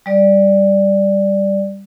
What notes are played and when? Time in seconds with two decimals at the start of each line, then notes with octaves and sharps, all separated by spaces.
0.06 G3 D5